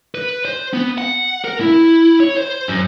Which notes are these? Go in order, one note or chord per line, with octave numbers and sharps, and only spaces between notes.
B4
C5
B3
F#5
A#4
E4
C#5
C5
F#2